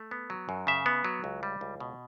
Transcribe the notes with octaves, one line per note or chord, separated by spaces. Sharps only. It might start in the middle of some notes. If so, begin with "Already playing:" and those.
Already playing: A3
B3
F#3
F#2
C#3 E5
B3
F#3
C#2
G3
C#2
B2